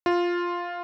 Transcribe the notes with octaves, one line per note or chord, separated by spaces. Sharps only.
F4